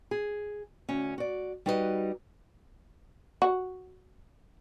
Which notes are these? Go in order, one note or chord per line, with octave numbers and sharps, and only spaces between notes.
G#4
D2 C#4
F#4 D5
G3 D#4 F#4 B4 C5 D#5
F#4